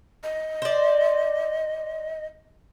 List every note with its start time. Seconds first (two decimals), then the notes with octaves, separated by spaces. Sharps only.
0.23 D#5
0.62 C5 D5